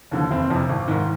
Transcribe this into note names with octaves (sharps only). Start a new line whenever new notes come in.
D#2 D3 F3
F1 C4
F2 C3
G#1
G#2 D#3